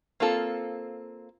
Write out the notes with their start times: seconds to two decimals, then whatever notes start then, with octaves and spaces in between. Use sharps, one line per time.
0.20 A#3 C4 F4 A4